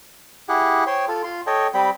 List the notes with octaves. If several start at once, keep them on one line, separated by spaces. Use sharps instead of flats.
E4 G4 G#4 F#5
C5 C#5 G5 C6
F4 A4
F4 C6
A4 C#5 D#5 G5
G3 C4 G5 B5